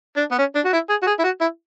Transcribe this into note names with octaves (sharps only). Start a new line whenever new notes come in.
D4
B3
C#4
D4
F#4
E4
G#4
F#4
G#4
E4
F#4
E4